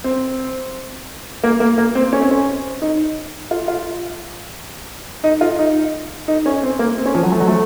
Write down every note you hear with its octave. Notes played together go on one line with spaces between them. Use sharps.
C4
A#3
A#3
A#3
C4
C#4
C4
C#4
D#4
F4
F4
D#4
F4
D#4
D#4
C#4
C4
A#3
C4
C#4
F3
F#3
A3
F#3
A3